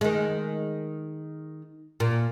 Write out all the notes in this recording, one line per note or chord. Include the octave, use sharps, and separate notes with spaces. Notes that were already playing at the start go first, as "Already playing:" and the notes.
D#3 G#3
A#2